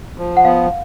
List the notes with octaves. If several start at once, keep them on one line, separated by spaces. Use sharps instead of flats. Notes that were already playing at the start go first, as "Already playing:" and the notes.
F3
F#5
B3 F5